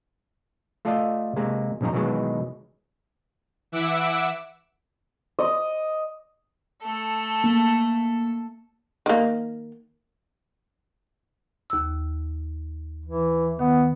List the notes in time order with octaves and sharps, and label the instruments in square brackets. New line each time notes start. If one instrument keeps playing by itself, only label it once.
[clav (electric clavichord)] A3 F4 A4 D5 D#5 F5
C3 G#3 A#3
A#1 F#2 D#3 F3 D#4 A#5
B2 D#3 E3 F#3 G#3
[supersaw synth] E3 E5 F#5 D6 E6 D7
[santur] D#5
[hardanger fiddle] A3 A4
[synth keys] A#3
[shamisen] D#3 A#3
[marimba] D#2 E6
[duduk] E3
[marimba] D#3 [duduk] B3